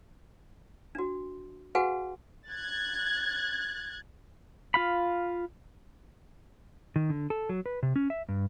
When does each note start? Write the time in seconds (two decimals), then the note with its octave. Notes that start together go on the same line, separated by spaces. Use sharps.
0.95 D4 F#4
1.75 F#4 G#4 B4 F5 F#5 G#5
2.49 F#6 G#6 A6
4.74 F4 F5 B5
6.96 D#3
7.10 D3
7.30 A4
7.49 F#3
7.66 B4
7.83 C3
7.96 C#4
8.10 E5
8.29 G2